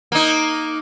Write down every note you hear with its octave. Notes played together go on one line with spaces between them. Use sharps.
A#3 D#4